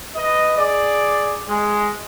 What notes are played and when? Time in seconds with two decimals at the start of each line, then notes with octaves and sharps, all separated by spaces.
0.16 B4 D#5
0.57 G#4 D5
1.47 G#3